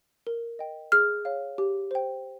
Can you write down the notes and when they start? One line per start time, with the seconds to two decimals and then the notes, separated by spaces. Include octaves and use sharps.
0.27 A#4
0.59 D#5 G5
0.92 G#4 F6
1.25 C#5 F5
1.58 G4
1.91 C5 G5